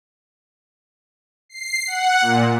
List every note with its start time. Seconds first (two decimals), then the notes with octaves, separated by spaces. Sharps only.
1.49 C7
1.87 F#5
2.21 A#2